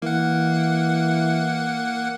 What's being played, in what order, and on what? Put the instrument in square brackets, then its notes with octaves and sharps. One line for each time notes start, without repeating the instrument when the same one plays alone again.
[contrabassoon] E3 [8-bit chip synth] A#3 F#5